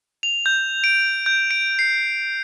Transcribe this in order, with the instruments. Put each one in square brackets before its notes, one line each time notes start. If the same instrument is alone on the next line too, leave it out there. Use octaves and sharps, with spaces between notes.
[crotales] F7
G6
D7
G6
D7
C7